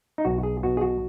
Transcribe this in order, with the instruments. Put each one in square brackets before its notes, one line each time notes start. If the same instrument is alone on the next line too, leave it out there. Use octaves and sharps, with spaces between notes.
[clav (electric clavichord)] D#4
B1 F#4
G#4
B2 F#4
G#4
F#4